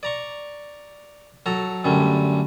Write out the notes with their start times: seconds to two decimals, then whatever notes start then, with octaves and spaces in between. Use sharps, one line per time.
0.03 D5 A#5 C#6
1.46 F#3 A4 A#5
1.84 F#2 D3 G3 A3